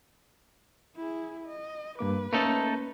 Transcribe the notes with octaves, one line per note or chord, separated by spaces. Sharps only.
E4 G#4
D#5
G2 A#3 B4 D6
A3 A#3 C#4 D#4 A4